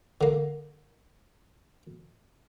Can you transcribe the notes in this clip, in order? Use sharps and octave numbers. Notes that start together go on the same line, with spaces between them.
D3 A#3